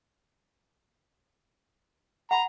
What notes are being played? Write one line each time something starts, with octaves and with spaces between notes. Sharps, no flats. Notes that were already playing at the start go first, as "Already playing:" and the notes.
F#5 A#5 B5